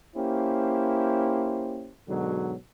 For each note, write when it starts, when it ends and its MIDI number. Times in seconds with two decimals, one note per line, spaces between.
0.15 1.91 58
0.15 1.91 61
0.15 1.91 64
0.15 1.91 67
0.15 1.91 72
2.08 2.54 44
2.08 2.54 47
2.08 2.54 50
2.08 2.54 54